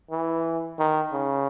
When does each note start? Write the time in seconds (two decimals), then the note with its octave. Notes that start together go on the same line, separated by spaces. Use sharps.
0.11 E3
0.79 D#3
1.13 C#3